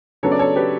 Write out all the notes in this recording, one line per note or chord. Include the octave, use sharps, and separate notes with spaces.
C#3 F#3 B3 D4 A4 C#5
D5
A4 C#5
G4 B4